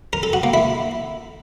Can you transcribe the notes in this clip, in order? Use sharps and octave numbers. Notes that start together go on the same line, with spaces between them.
A#4
A4
F#4
A#3
E4